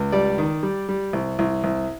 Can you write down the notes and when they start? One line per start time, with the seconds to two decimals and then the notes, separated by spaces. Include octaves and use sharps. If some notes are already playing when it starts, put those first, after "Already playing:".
Already playing: C#2
0.12 G3 D5
0.38 D#3
0.63 G3
0.89 G3
1.13 C2
1.39 C2
1.64 C2